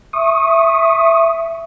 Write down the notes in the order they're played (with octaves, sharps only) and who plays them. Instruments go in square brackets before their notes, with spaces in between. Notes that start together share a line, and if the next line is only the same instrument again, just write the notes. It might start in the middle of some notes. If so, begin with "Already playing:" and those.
[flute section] E5 [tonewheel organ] C#6 D#6